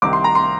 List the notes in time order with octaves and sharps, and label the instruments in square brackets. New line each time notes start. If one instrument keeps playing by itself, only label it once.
[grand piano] C2 C3 D#3 D6
C6
A#5
C6